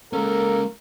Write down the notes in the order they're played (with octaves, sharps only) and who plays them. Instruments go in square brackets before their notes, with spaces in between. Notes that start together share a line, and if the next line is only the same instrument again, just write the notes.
[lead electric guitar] G#3 C#4 [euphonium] A#3 [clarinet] A4 [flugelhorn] A#4